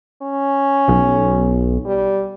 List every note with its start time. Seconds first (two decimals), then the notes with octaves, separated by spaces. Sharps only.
0.22 C#4
0.88 B1
1.86 G3